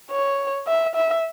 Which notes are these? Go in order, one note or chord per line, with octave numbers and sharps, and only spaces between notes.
C#5
E5
E5